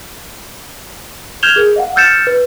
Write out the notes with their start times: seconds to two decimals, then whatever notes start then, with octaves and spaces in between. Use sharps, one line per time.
1.43 F6 G6 G#6 E7 F7 G7
1.56 G#4 A#4
1.76 D#5 F5 F#5
1.96 E6 F6 G6 A6 C#7 E7
2.27 B4